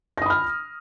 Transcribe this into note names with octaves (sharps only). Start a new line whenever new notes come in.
B5 D#6 F6 A#6